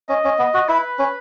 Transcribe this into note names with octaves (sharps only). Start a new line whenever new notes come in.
C#4 D#5
C#4
B3
F#4
E4 B4
C#4